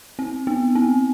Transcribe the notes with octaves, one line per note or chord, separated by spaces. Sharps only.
C4
B3
C4